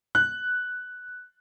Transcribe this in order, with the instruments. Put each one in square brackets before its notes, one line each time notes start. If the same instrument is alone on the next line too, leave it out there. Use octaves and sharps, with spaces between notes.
[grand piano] F#6